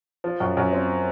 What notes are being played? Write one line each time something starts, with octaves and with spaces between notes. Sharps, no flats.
F3
F#2
F#2
C4